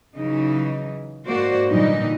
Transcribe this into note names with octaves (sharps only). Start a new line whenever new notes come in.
C#3 E3 F#3 D#4
G#2 A#3 F#4 C5 D5
A#2 D3 E3 F#3 G3 D#4